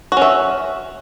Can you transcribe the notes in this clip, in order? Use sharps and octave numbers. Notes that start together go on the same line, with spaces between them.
C#4 F#4 E5